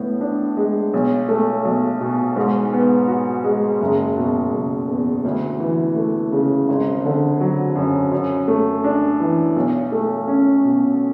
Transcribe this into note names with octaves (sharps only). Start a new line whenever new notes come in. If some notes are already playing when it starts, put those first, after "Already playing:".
Already playing: A2 B3
D4
G#3
B1
A3
B1
B2
G#2
B3
F#4
G#3
F#1
B2
F#1
E2
D2
E3
A3
C#3
G#1
D3
F#3
F#2
F#2
A3
D4
E3
B1
A3
C#4
B2